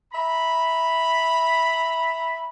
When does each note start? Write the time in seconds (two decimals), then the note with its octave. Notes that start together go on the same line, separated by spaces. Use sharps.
0.14 E5 A#5 B5